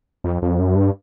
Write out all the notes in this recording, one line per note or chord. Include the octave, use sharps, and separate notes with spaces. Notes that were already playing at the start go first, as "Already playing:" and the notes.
F2
F2
F#2
G2